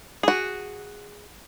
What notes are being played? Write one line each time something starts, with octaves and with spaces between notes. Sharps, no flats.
F#4 G#4